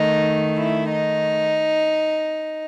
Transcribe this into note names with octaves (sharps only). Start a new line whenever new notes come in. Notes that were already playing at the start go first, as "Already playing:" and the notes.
Already playing: D#3 A3 D#4
E4
D#4